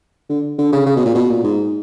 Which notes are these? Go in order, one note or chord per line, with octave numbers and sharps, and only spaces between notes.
D3
D3
C#3
C#3
B2
A#2
B2
A#2
G#2